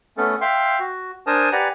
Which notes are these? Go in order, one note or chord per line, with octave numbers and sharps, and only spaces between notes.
A3 B3 C#4 A4
E5 F5 G5 C6
F#4
D4 A#4 C5 G#5 A5 D#6
G4 B4 D5 F#5 G#5 A#5